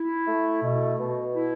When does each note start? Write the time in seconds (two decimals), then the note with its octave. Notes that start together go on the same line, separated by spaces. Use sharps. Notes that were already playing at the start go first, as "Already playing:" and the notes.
Already playing: E4
0.27 A3
0.63 B2
0.99 B2
1.35 E4